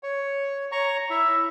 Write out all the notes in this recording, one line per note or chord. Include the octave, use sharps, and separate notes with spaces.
C#5
C#5 A#5 C#6
E4 E5